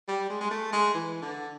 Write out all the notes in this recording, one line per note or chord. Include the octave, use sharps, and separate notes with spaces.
G3
G#3
G#3
A3
G#3
E3
D3